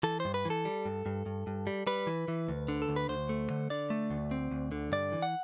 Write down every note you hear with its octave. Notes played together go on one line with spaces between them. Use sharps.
E3 A4
C5
G2
B4
E3
A4
G3
G2
G2
G2
G2
G3
G3 B4
E3
E3
D2
D3
A4
D2
B4
D2 C5
A3
D3
D3 D5
A3
D2
C4
D2
D3
G2 D5
E3
F#5